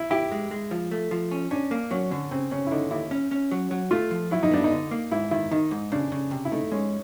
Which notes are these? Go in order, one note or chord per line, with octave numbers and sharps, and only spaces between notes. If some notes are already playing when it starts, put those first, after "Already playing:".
Already playing: E4
E4 G4
G#3
G#3
F3
A3
F3
C#4
C#4 D4
A#3
F#3 C#4
D3 C#4
C#3 C4
C#3 C#4
E4
D3 D#4
D#2 E4
C#4
C#4
F#3
F#3
A3 F4
F3
F#3 E4
D#4
B3 D4
D#4
D3
A#3
G#2 E4
D#3 E4
D#3 D#4
G#2
C#3 D4
C#3
C3
E4
A3 D#4
G#3 C#4